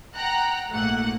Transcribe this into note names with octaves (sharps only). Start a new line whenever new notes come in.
F#5 G5 A#5 F#6
A#1 G#2 A3 A#3 F#5 F#6